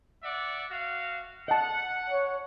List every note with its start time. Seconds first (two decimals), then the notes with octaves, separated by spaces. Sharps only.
0.23 D5 E5 F#5
0.71 F#4 F5
1.48 D#5 F#5 A5
2.10 C#5